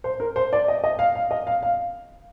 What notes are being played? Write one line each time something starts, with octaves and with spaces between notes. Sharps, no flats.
C5
A#4
C5
D5
D#5
D#5
F5
F5
D#5
F5
F5